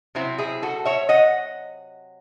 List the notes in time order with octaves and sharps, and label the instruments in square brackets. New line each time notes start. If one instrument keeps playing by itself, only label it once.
[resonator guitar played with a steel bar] C3 F#3 C4 E4
E4 G#4
F#4 A4
C#5 E5
D#5 F#5